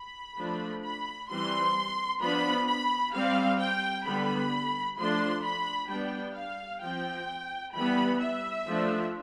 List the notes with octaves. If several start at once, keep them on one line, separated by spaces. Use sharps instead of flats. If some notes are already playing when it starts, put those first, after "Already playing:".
Already playing: B5
F3 A3 D4
B5
E3 G3 C4 C6
F3 B3 D4 B5
B5
G3 C4 F5
G5
D3 G3 B3 B5
F3 A3 D4 C6
B5
G3 B3 D4 G5
F5
F3 C4 G5
E3 G3 B3 B5
E5
F3 A3 D4